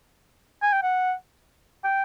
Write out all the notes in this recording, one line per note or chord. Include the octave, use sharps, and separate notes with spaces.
G#5
G5
F#5
G5